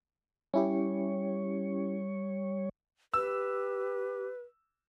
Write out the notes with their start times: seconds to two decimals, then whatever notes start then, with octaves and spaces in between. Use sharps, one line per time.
0.54 G3 C#4 E4 G4 C#5
3.14 G4 B4 E6